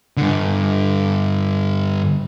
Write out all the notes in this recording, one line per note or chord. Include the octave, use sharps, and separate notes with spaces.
G2 D3